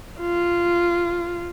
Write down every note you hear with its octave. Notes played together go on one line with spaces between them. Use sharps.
F4